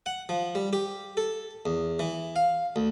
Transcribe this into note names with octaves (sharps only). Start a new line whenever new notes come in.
F#5
F3
G3
G4
A4
E2
E3
F5
D2